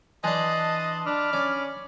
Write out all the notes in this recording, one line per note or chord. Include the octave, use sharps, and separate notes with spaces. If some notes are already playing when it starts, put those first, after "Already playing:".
E3 D4 D#5 A5 C6 F#6
D4 B5 D6 F6
C#4 D5